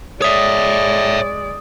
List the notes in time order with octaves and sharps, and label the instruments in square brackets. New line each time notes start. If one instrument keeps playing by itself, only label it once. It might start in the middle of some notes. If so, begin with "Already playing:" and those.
[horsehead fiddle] G#3 D5 [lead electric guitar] C#5 E5 [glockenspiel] D#6